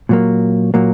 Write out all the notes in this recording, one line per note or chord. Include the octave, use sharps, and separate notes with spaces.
A#2 F#3 A#3
A#2 F#3 A#3